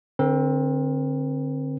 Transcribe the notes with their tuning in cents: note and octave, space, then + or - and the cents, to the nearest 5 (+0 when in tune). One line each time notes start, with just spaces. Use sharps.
D3 +0 C4 +15 A#4 +45